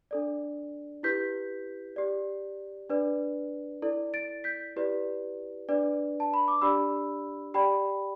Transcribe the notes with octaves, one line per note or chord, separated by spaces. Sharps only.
D4 A4 D5
E4 G4 B4 G6 B6
G4 D5
D4 B4 D5
E4 A4 D5
A6 D7
G6 B6
E4 G4 B4 D5
D4 B4 D5
A5
B5
D6
D4 G4 D5 B5 E6
G4 D5 G5 B5